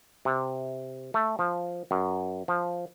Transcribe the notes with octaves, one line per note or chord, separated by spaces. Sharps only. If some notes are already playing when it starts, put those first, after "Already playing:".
C3
A3
F3
F#2
F3